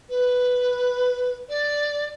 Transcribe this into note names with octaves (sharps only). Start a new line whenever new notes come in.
B4
D5